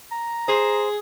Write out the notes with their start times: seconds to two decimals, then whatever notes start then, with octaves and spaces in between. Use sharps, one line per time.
0.12 A#5
0.48 G#4 C5